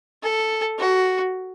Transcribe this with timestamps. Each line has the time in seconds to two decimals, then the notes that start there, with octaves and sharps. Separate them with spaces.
0.23 A4
0.79 F#4